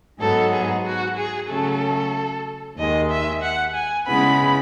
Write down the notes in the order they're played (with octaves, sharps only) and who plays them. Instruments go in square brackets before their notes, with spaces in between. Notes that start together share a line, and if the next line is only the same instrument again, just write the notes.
[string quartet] G#2 F#3 B3 D#4 [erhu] A4
[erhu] G#4
F#4
G#4
[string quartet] C#3 F#3 A3 [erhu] A4
[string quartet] D#2 D#3 G#3 [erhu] D#5
[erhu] E5
F#5
G#5
[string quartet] C#3 G#3 B3 E4 [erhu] B5